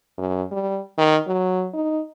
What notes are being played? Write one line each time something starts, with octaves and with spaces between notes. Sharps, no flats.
F#2
G3
D#3
F#3
D#4